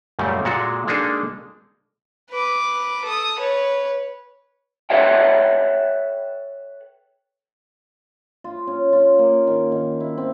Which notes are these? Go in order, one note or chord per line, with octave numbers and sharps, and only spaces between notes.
F#2 A#2 C#3 G3 A3
A#2 G#3 F#4 A4
G#3 A#3 D4 D#4 G#4 A4
B4 D6
A4 D#6
B4 C#5
A4 B4 C#5 E5 F#5 G5
F4
C#4
F4
A#3
D#3
D#3
E4
C4